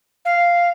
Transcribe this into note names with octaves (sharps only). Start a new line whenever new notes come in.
F5